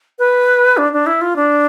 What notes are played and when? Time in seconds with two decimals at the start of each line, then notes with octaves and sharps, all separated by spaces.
0.19 B4
0.77 D4
0.93 D4
1.07 E4
1.21 F4
1.36 D4